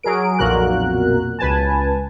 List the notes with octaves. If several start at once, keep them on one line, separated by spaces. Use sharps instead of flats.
F#3 G#4 A#4 D7
B1 F2 A#2 F#4 A#4 F#6
C#2 B4 G#5 A5